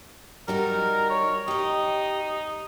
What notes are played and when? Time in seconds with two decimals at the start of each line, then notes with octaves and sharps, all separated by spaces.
0.48 G3 D#4 F#4 A#4
1.10 C#5
1.48 D#4 G4 D#5